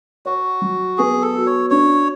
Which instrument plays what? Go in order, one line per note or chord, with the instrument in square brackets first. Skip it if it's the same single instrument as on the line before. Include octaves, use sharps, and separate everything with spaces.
[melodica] F#4 [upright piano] C#5
[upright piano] F#3
[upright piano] B3 [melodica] G#4
[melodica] A4
[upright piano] F#4
[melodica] C#5
[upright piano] D4 [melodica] C#5